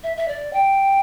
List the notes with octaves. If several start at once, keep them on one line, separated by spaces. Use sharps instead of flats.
E5
E5
D5
G5